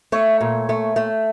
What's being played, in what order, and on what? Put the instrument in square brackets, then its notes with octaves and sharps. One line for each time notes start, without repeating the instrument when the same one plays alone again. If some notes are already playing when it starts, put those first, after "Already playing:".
[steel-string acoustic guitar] A3 C#5
A#2
A3
A3